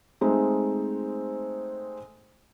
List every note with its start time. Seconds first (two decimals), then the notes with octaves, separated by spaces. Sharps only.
0.21 G#3 A3 C4 D#4